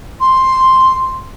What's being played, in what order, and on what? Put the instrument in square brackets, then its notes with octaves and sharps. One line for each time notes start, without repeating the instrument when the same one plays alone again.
[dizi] C6